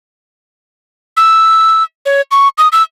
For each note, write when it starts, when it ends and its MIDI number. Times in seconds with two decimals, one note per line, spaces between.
1.17 1.83 88
2.06 2.21 73
2.31 2.48 85
2.58 2.68 87
2.72 2.83 88